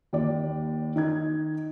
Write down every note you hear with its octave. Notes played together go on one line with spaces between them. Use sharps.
D#2 D5
D#3 D#4 G#6